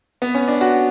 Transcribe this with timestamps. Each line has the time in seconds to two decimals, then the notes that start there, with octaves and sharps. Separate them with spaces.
0.22 B3
0.34 C#4
0.48 D4
0.61 F#4